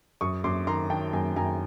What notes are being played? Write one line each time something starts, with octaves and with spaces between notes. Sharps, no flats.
F#2 C#6 D#6
F#2 C6 D6
D#3 A#5 C6
D#3 G5 A5
F#2 G#5 A#5
F#2 G#5 A#5